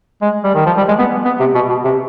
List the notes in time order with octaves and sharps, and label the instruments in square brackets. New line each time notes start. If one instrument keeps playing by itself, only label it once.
[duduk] G#3
G3
D#3
F3
G3
G#3
B3
B3
C3
B2
B2
C3